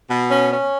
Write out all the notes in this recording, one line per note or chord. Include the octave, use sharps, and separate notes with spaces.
B2
C#4
C#4